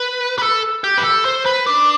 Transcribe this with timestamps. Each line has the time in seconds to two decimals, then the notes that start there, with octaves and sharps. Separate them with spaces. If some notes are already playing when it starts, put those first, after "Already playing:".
Already playing: B4
0.38 B4
0.43 A4
0.84 G4
0.98 B4
1.04 A4
1.25 C5
1.46 B4
1.66 D4